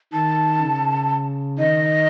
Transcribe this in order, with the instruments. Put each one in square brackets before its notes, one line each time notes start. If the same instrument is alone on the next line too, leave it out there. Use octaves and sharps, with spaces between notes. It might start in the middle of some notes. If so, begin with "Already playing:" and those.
[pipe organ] D#3 [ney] A5
[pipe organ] C#3
[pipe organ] D#3 [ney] D#5